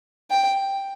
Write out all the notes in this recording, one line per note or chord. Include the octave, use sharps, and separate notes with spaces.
G5